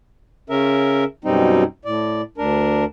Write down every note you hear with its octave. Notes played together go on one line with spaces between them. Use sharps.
C#3 C#4 A#4 E5
F#2 B2 G3 C4 D#4
A2 D5
D2 D4 A#4